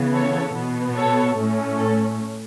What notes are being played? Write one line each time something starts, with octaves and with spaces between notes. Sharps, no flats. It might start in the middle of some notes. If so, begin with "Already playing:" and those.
Already playing: C#3 E3 B3
A4 C#5
B2 B3
A4 C#5
A2 A3 C#4
A4